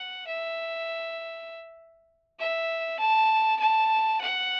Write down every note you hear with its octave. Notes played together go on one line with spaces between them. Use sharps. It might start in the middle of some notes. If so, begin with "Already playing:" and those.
Already playing: F#5
E5
E5
A5
A5
F#5